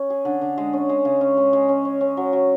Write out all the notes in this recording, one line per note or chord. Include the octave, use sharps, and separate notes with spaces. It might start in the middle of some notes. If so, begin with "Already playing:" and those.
Already playing: C#4
G#4
D3
D3
G#3
C#4
G#3
C#3
C#4
G#3
G#3
C#4
C#4
C#4
F#3
F#3